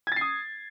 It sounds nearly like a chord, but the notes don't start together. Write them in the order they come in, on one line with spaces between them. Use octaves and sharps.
G#6 A6 C7 D#6